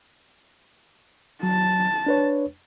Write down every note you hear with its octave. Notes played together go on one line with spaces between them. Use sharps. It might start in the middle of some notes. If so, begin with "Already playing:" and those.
F#3 A5
D4 B4 C#5